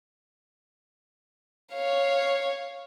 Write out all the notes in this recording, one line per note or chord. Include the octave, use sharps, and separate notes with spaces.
C#5 F5